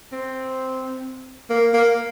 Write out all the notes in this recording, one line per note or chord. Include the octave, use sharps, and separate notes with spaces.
C4
A#3
A#3